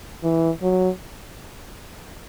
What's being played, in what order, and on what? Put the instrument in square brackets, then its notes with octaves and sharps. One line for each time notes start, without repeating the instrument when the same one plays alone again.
[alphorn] E3
F#3